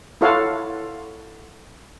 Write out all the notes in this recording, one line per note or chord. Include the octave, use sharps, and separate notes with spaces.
E4 F4 A4 C#5 F5 F#5